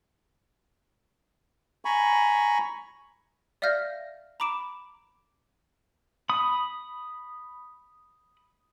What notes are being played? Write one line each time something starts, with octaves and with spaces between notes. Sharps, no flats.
G#5 A#5 B5 C#6
D5 E5 F5 F6 G6 A#6
A#5 B5 D6 D7 E7
B5 D#6